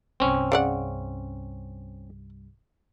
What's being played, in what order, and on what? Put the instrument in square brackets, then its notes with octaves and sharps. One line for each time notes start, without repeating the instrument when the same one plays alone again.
[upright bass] C2 G2 [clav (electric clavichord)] C4 C#4
[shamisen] C#3 D5 F#5